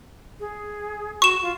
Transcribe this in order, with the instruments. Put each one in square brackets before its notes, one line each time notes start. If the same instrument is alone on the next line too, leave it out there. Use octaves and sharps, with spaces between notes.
[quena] G#4
[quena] F#4 [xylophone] C#6 E7
[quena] F4